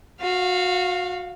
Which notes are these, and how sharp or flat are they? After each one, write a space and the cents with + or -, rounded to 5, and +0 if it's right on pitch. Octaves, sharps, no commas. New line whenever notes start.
F#4 -25 F5 +0